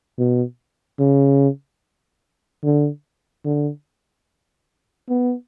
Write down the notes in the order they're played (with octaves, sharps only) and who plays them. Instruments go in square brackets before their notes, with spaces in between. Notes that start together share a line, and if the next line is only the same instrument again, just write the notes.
[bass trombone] B2
C#3
D3
D3
B3